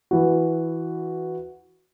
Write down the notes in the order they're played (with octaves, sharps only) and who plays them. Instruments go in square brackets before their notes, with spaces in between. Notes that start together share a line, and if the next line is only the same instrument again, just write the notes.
[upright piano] E3 F#4